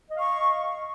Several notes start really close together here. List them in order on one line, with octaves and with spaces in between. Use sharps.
D#5 F5 C#6